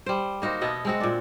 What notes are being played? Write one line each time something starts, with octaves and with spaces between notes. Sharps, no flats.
G3 C5
A#3 D#4 F#4 C5
B2 B3 D#5 E5
G#3 C4 F#4
A#2 D4